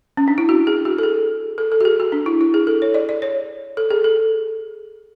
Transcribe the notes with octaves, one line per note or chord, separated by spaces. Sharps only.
C#4
D4
E4
F#4
G#4
F#4
A4
G#4
A4
A4
F#4
G#4
F#4
D4
E4
E4
G#4
A4
C#5
D5
D5
C#5
A4
G#4
A4